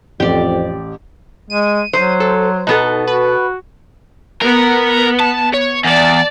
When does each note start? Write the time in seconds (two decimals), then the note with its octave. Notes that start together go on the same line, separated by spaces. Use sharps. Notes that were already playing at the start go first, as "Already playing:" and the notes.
0.20 A1 F2 G4 D5
1.50 G#3 D#7
1.93 F#3 C5
2.20 A4
2.67 B2 B3 D#4 A4
3.07 F#4 B4
4.42 B3 A#4
5.20 A5
5.54 C#5
5.84 E2 D5 A5